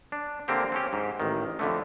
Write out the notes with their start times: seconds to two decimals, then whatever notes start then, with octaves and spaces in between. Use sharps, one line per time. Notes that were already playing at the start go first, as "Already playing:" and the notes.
0.12 D4
0.48 D3 A#3 C4 G4
0.72 C4 C#4 G4
0.93 G#2
1.20 A1 D#3
1.59 F2 D3 A3